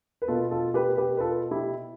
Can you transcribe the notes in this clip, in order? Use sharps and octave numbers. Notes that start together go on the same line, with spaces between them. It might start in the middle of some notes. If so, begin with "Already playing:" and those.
B4
B2 F4 A4
F4 A4
G4 B4
G4 B4
B4
F4 A4
E4 G4